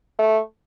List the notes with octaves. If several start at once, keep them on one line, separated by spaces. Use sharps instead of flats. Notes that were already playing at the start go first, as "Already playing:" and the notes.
A3